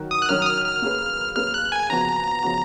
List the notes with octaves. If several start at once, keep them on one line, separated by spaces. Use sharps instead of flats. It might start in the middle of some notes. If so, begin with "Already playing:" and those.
Already playing: D#3 F#3 F#4 A#4
D#6
F#6
D#3 F#3 C#4 F#4 A#4 F6
D#6
F6
F6
A#3 C#4 G#4 B4
A#3 C#4 G#4 B4 F6
F#6
G#5
C#3 F3 B3 F#4 A#5
C#3 F3 B3 F#4